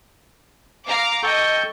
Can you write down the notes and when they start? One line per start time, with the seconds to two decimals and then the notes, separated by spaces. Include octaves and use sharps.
0.86 F5 A#5 D6
1.23 A4 D#5 G5 C#6 G6